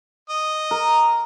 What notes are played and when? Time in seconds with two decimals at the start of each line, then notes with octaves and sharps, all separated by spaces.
0.30 D#5
0.71 A#4